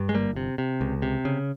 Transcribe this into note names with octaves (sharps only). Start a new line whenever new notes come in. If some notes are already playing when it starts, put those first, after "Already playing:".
Already playing: G2
G#3
G1 G3 A#3
C3
C3
C#2
C3
C#3